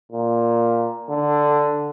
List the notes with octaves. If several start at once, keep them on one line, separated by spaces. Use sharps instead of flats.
A#2
D3